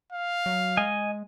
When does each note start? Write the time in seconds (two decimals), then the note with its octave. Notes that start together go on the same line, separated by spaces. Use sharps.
0.12 F5
0.46 F#3
0.77 G#3 D#5 G#5